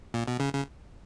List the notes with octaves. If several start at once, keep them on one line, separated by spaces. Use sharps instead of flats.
A#2
B2
C#3
C#3